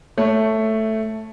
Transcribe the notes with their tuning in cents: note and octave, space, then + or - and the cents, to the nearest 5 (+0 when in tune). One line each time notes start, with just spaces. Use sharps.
A3 +0 C#5 +0